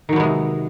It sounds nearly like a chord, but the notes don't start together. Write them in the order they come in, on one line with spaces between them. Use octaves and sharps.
D#3 F#3 B3 G#3 C3